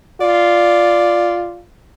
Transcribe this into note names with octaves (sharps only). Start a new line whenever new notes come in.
F4 D5